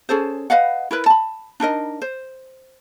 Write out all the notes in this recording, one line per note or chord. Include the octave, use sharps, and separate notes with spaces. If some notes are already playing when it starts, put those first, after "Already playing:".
C#4 G#4 A4 C5
B4 D#5 F5 F#5
E4 A#4 B4
A5 B5
D4 D#4 A#4 D#5
C5